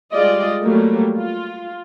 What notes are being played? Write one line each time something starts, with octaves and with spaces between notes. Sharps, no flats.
G3 G#3 F4 D5 D#5
F#3 G3 A3 A#3
F4